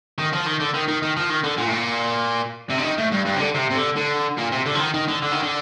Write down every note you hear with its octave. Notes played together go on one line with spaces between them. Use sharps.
D#3
F3
D#3
D3
D#3
D#3
D#3
F3
D#3
D3
A#2
A2
A#2
C3
D3
D#3
A2
G2
G2
C3
D3
C3
C3
D3
D3
A#2
C3
D3
F3
D#3
D#3
D3
D3
D#3
D3